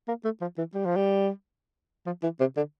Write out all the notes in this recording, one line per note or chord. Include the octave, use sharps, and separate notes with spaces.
A#3
A3
F3
E3
G3
F3
G3
F3
E3
C3
D3